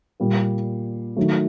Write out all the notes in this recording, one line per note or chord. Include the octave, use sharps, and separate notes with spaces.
A#2 G3 A#3
D#3 F#3 A3